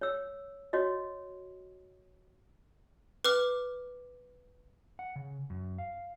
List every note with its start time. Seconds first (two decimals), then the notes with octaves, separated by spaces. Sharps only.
0.01 C#5 E6
0.73 F#4 C#5 D#5
3.25 B4 D6 F6
4.99 F#5
5.16 C#3
5.50 F#2
5.78 F5